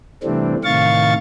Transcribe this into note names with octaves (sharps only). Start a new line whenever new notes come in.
C3 E3 G3 A3 C4 D4
A2 C3 D#3 F5 C#6 A6